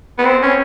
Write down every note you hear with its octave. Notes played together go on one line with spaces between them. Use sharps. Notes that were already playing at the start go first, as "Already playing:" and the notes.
B3
C4
C#4